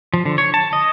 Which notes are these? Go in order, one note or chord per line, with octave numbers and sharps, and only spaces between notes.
F3
D3
C#5
A5
D#5